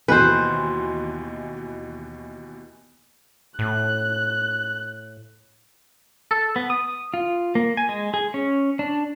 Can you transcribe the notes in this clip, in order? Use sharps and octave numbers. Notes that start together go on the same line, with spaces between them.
D#2 B2 E3 B4 C5
A2 F#6
A4
B3
D#6
F4
A#3
G#5
G#3
G#4
C#4
D4